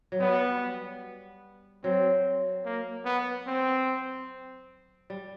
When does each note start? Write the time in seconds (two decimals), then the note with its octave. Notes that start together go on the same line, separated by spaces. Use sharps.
0.12 F#3
0.20 G3 B3
1.84 F#3 C4
2.65 A#3
3.05 B3
3.47 C4
5.10 G3